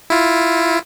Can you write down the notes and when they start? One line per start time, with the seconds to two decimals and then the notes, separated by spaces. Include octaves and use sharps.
0.10 E4 F4